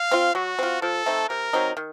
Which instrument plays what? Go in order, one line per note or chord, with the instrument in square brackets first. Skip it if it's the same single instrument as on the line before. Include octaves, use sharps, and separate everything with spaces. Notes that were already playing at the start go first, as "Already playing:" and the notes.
Already playing: [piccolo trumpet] F5
[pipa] C4 F4
[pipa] F#3 [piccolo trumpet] F#4
[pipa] C4 F4
[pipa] F3 [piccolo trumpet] A4
[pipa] A3 C4 D#4
[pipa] C3 [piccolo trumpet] A#4
[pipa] F#3 C4 D#4
D#3